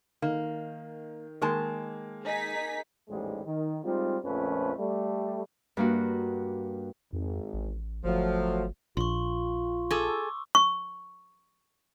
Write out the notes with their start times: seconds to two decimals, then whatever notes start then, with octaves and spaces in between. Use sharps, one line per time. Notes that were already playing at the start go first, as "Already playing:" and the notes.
0.22 D#3 A#3
1.42 D#3 G#3 A#3 A5
2.24 D#4 G#4 B6
3.09 A1 D#2 G#2 G3 G#3
3.46 D#3
3.84 G3 G#3 C4 D#4 F4
4.24 A#1 F2 F3 A3 C#4 B4
4.78 G3 A3
5.77 G2 A#3 F#4
7.13 G#1 F2
7.53 A1
8.04 G1 F3 F#3 A3
8.97 A#1 F4 C6 C#6
9.91 G#4 A4 C#6 D6 E6
10.55 C#6